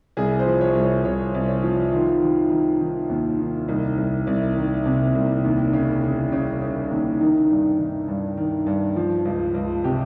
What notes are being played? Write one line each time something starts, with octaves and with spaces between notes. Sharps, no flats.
C2 G#4
C5
F3
C#5
C2
C#5
C2 C#5
C2
C#5
F3
D#3 F4
D#3
D#3
D#3
D#2
D#3
C2 D#4
C2
C2
D#3
C3
C2
D#2
C#3
C#3
C#3
C#3
D#2
D#3 D#4
G2
D#3
G2
D#3
G2
F3
C#2
C#2
C3 G4